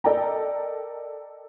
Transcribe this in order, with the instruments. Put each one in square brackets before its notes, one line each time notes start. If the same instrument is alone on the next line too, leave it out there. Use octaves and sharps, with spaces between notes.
[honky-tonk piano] A4 A#4 D5 D#5 G5 A#5